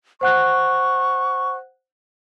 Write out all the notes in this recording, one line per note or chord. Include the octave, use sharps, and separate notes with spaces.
C5 F#5 C#6 F#6